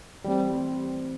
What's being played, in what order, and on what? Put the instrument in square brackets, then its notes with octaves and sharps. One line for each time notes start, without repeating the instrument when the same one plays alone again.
[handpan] E3 A3 C4 [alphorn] G3